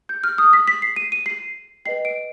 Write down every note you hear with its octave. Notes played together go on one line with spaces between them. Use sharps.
G6
F6
D#6
B6
B6
C7
D#7
D#7
C7
B4 D#5 G5 C7
D7